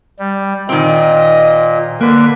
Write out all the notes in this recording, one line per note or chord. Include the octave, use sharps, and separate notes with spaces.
G3
A#2 D#3 C4 D#5
D3 A#3 B4